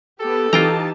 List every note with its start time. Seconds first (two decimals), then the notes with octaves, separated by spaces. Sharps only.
0.21 B3 G4 A4
0.53 E3 D#4 F4 G4 G5 A5 A#5